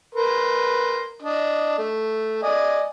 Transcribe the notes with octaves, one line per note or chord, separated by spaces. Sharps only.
A#4 B4 C6
D4 D#5
A3
D5 D#5 G#5